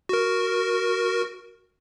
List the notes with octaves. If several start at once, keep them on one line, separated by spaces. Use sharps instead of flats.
F#4 A#4